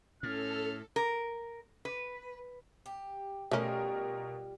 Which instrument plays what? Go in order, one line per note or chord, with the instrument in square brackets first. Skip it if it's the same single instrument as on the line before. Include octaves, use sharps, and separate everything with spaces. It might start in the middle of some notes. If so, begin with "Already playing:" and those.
[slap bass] A2 [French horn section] C#4 [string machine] A4 [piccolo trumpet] F6
[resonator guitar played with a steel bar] A#4
B4
[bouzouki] G4
[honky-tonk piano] B2 A#4 [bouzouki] G3 F4 G4 [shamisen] A3 C#4